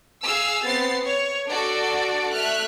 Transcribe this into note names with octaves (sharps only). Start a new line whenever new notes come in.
G#4 F5 E6
B3 C4 A6 C7
C#5
D4 F#4 A4 D5 D7
A3 E5 F6 F#6